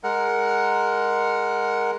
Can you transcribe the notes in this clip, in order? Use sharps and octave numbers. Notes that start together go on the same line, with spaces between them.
G#3 A#4 F#5